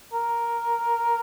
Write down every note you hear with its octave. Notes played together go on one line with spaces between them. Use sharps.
A#4